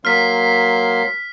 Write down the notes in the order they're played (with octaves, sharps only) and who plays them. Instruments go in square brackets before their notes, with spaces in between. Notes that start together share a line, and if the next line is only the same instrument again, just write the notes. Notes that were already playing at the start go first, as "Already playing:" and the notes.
[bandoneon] F#3 A#3 C6 [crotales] F6 B6